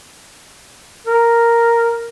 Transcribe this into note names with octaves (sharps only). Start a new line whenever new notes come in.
A#4